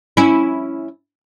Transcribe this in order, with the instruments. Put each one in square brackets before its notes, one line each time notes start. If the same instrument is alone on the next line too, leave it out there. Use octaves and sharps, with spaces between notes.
[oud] C#4 E4